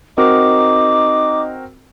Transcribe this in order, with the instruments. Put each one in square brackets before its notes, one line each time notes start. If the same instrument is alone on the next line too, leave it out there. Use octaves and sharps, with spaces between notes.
[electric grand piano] C4 F#4 A#4 [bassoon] D#4 [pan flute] D6